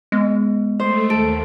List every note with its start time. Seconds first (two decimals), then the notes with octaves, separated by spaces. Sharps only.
0.12 G#3 B3
0.80 A3 C5 D#5
1.10 D#2 A4 D7